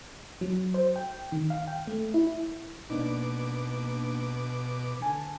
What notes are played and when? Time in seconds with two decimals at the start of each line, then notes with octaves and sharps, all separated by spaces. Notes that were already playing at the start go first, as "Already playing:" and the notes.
0.41 F#3
0.74 C5
0.96 G5
1.32 D#3
1.50 F5
1.67 G5
1.87 A3
2.14 E4
2.90 B2 A#3 D4 D#4 D6
5.01 D3 G#5 A5